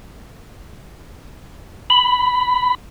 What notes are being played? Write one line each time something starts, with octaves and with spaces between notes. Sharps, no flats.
B5